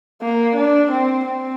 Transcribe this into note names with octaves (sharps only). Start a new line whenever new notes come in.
A#3
D4
C4
C4